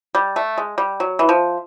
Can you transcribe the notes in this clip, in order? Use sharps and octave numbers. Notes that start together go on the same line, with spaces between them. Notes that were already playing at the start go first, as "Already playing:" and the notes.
G3
A3
G#3
G3
F#3
E3
F3